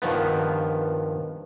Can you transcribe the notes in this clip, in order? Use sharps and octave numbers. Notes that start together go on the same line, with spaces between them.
G2 D#3 F3 B3